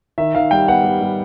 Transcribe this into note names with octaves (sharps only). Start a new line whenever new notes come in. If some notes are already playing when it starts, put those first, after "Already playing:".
D#3 E5
D#3 F5
G3 G5
B3 F#5
G3
G3